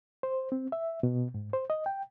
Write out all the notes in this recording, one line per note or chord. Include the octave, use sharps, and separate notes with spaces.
C5
C4
E5
B2
G#2
C5
D#5
G5